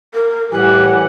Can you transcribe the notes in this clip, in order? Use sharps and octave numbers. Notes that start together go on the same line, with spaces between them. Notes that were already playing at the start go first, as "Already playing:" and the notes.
A#4
A2 E3 G3 G4 F#5 G#5